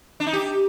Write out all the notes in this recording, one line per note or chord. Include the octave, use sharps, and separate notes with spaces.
D4
D#4
G4